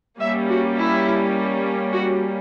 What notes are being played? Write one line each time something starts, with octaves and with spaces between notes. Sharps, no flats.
G3 A#3 C#4 E5
F#4
E4
F#4